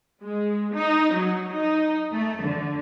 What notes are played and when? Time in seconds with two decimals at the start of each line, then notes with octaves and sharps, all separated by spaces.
0.23 G#3
0.74 D#4
1.15 F#3
1.55 D#4
2.12 A3
2.42 D3